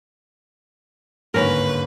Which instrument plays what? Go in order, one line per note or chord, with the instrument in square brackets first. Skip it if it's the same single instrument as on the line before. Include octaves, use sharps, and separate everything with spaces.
[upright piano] G1 D#2 G#2 [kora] C#4 A#4 [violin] B4